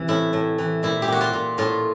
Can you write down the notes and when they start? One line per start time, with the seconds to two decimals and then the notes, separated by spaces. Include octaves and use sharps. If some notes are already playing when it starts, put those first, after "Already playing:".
Already playing: C3 E3
0.08 A2 E4
0.33 A2
0.58 E3
0.83 A#2 E4
1.02 G4
1.08 A#2 F#4
1.21 F4
1.33 A#2
1.58 A2 F4